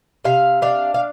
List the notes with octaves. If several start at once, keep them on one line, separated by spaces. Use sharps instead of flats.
C3 F5
D4 F5
F5